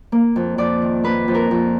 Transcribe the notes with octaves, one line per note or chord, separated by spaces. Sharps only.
A#3
F2
F2 D5
D#3
A#3 B4
F2
A#4
F2